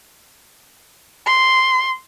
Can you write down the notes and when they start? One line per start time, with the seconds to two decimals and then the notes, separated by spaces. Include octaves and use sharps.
1.26 C6